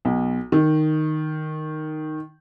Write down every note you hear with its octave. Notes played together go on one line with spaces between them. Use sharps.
B1
D#3